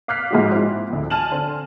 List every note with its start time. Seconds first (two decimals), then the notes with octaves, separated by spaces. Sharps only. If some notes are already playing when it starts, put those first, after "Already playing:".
0.08 F5 D6 F6 F#6 B6 C7
0.31 G#2 F3 G#3 D#4 F#4
0.52 C4 E4
0.90 D2 A2
1.10 G#5 A5 F6 D#7 E7 F#7
1.31 D3 C4